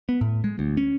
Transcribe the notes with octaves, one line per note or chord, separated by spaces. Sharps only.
B3
A2
G#3
D2
C#4